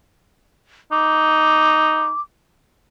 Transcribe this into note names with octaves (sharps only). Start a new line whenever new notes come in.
D#4 D6